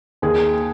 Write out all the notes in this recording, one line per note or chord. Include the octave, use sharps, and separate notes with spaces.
D#2 G#4